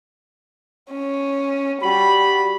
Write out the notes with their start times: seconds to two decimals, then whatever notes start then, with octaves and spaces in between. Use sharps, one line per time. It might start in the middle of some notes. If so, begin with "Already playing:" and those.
0.91 C#4
1.82 G3 F#4 B5